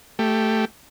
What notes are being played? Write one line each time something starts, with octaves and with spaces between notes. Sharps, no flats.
A3 G4